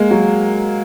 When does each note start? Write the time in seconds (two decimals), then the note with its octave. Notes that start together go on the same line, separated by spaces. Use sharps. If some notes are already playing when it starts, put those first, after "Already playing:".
Already playing: G#3 A#3
0.11 F#3